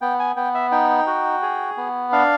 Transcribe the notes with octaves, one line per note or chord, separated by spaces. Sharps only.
B3 G5
G#5
B3 G5
E5
D#4 G5
F#4
G#4
B3
D4 F5